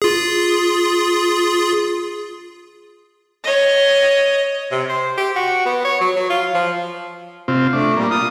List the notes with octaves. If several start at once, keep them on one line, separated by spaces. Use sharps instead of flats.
F4 G#4
C#5 D#5
C3
C5
G4
F#4
B3
C#5
F#3
F#3
F4
F3
C3 C4 F4
A3 D4
A#2 G3 A#3
F4 D#6